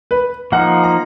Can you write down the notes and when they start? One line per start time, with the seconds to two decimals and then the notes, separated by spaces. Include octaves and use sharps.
0.11 B4
0.52 F3 A#3 D#4 F#5
0.84 A#5